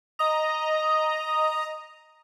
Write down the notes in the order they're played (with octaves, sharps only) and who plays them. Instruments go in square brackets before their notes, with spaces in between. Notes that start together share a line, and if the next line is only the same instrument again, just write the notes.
[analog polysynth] D#5 A#5 [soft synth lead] D#6